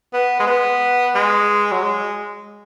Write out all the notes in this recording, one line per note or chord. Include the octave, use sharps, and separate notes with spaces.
B3
G#3
B3
G#3
F#3
G#3